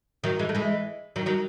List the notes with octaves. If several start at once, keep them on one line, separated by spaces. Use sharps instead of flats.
D#3 F#3
E3 G#3
A3
E3 G#3
D#3 F#3
D#3 F#3